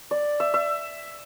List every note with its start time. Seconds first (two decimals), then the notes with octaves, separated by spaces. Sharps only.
0.11 D5
0.40 E5
0.54 E5